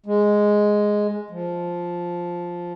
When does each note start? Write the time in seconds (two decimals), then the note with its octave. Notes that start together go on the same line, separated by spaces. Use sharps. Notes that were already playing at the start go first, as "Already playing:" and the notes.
0.06 G#3
1.31 F3